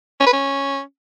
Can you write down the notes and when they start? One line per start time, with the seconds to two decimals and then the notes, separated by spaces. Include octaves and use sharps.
0.20 C#4
0.27 B4
0.33 C#4